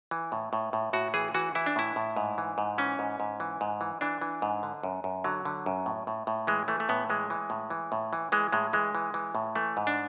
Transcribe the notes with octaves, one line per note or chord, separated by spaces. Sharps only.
E3
A2
A2
A2
A2 F#4
E3 G#4
E3 F#4
E3 E4
D4
A2 E4
A2
G#2
E3
G#2
E3 C#4
G#2
G#2
E3
G#2
E3
E3 D4
E3
G#2
D3
F#2
F#2
D3 F#3
D3
F#2
A2
A2
A2
E3 G#3
E3 A3
A3
A2 B3
E3 G#3
E3
A2
E3
A2
E3
E3 G#3
A2 G#3
E3 G#3
E3
E3
A2
E3 A3
G#2
D4